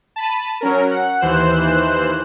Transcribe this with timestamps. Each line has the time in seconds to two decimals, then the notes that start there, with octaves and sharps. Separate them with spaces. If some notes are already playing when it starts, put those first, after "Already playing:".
0.16 A5 B5 D#7
0.61 F#3 C#4 A#4
0.91 F#5
1.21 D#2 E3 C5 F#6 E7